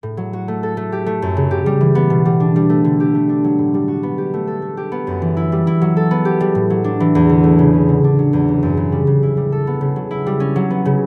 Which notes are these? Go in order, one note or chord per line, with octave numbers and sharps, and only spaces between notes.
A2
F#3
F#4
A3
A4
A3
G4
A3
F#2
C#3
G4
G3
E3
B3
B2
G3
D4
G3
A3
D3
G4
A3
D4
F#3
A2
G3
F#4
B3
G4
A3
A4
A3
G4
B3
F#2
E3
E4
G3
E4
F#3
A4
B3
G4
G3
A2
F#3
D4
E3
E2
D3
A3
C#3
C#4
D3
D4
F#3
E2
C#3
F#2
C#3
G3
C#3
E4
G3
A4
B3
C#3
F#3
E4
G3
C#4
F#3
B3
C#3